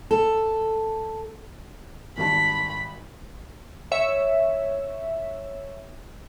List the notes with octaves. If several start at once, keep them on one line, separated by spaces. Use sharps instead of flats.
A4
G#1 G3 A5 B5
C#5 E5